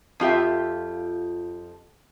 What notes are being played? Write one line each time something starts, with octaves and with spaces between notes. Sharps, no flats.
F2 F4 G4 E5